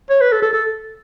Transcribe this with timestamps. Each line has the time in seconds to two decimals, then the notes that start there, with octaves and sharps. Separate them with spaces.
0.10 C#5
0.21 B4
0.32 A4
0.43 A4
0.53 A4